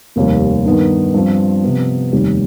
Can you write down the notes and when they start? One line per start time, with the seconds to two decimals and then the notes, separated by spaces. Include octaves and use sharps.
0.16 F1 D#2 D#3 G3
0.65 G2 D#3 B3
1.14 G2 F3 C4
1.63 C3 F3 B3
2.12 F1 D#2 D#3 G3